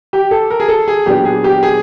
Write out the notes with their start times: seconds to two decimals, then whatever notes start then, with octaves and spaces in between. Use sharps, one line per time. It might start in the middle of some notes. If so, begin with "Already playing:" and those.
0.13 G4
0.31 A4
0.50 A#4
0.60 G#4
0.68 A4
0.88 G#4
1.06 A#2 F#3 B3 D4 G4
1.25 G#4
1.44 G4
1.63 G#4